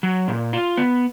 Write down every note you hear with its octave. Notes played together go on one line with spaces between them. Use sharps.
F#3
A#2
F4
B3